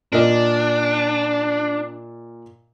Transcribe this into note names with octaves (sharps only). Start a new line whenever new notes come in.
A#2 D4 A#4 D#5